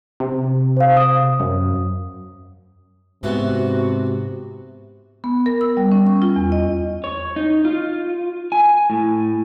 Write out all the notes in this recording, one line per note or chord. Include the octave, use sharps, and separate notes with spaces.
C3
C5 F5
D#6
F#2
G#2 C3 E3 B3 F#4
B3
A#4
E6
G3
C#4
C#6
F4
E2
D#5
C#5
D#4
F4
G#5
A2